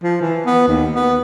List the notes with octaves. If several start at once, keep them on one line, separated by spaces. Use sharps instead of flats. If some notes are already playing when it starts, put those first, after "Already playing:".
F3
E3
B3
D#2
B3